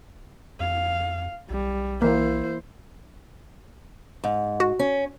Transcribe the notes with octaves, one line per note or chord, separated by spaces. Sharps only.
F2 F5
B1 G3
E3 A#3 E4 C5
G#2
F#4
C#4